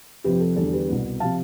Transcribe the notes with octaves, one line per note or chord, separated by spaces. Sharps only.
F2 C3 F3 C4 G4 B4
A4
E2 D3 G3 A4
G4 B4
C2 B2 B3
C3 F3 F5 A5